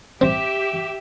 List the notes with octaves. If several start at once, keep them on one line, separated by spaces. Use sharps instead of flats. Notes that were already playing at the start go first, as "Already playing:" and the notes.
C4 G4 E5